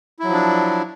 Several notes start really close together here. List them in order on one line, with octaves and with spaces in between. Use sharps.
E4 F#3 F3 D4